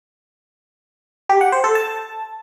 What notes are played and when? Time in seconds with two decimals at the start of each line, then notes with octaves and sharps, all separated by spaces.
1.29 G4
1.41 F#5
1.52 C5
1.64 A4
1.75 A5